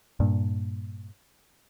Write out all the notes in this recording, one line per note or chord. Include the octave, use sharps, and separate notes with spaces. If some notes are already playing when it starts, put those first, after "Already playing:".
G2 A#2